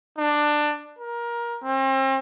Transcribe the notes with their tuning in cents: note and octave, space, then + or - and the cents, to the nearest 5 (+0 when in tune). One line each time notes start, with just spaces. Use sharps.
D4 +15
A#4 +20
C4 +40